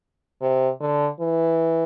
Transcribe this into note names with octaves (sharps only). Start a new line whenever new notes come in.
C3
D3
E3